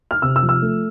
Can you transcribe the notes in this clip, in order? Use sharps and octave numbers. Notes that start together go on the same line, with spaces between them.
F6
C3 E6
E6
F3
E6
A3